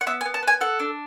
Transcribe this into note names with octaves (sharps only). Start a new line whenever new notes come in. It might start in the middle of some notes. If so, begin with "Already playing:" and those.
F#5
B3 E5
G#5
B3
A5
B3 G#5
A4 F#5
D4